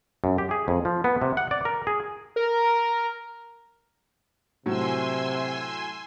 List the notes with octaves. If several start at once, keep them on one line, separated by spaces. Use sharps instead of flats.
F#2
G4
G#4
F2
F3
B3
C3
F#5
D5
A#4
G#4
A#4
A2 C3 F#3 G#5 C6 E6